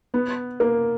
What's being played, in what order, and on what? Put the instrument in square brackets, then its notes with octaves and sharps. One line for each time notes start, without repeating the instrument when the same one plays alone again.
[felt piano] B3
A#3